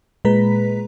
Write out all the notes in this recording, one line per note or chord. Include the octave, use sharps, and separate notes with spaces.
A#2 G#3 B4 A#5 B6